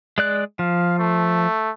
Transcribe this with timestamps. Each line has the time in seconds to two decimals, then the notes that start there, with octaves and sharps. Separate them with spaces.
0.18 G#3 D5 F#6
0.59 F3 F5
0.99 A3